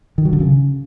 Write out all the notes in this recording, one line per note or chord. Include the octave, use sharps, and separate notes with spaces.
D#3
F#3
D3
C#3